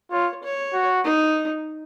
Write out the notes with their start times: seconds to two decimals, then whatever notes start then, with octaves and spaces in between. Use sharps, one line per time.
0.11 F4 C#5
0.43 C#5
0.74 F#4
1.04 D#4